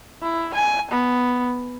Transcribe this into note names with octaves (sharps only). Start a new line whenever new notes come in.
E4
G#5
B3